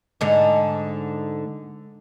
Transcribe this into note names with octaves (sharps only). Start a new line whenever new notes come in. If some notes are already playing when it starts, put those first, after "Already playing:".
G#2 D3 G#3